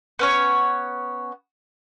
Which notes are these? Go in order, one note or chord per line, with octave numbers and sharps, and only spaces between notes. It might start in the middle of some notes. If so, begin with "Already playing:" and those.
B3 C#4 C#5